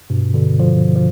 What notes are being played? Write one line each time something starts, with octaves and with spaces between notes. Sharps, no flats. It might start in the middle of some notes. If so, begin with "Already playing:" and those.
G2 B2
B2 D3
D3 F3
F3